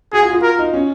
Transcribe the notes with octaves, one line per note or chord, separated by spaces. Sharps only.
F#4 G#4
F4
F4
A#4
D#4
C#4